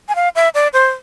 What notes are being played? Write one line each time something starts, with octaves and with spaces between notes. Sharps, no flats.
G#5
F5
E5
D5
C5